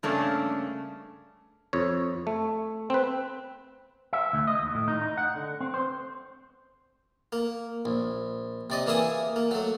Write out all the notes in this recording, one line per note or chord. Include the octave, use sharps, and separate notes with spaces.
G2 C#3 A3 A#3 C#4 D4
F2 C#5
A3
C4 B4
E5
D2
D#5
D#2
A2
D#4
D#4
F#5
D3
C4
C5
A#3
A#1
C3 D5 D#5
E3 A#3 G#4 E5 D#6
A#3
F#3 A3